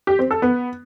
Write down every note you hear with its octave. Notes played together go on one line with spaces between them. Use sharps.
G4
C4
A4
B3